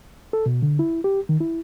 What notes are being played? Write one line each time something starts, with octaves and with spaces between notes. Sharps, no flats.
A4
B2
D3
E4
G4
D#3
E4